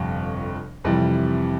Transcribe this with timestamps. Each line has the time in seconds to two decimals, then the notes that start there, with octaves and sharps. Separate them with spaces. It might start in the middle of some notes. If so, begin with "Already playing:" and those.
Already playing: G1 F2 C3
0.84 F2 C3 E3 G3